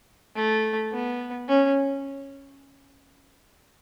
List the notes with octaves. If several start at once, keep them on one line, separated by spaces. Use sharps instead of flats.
A3
B3
C#4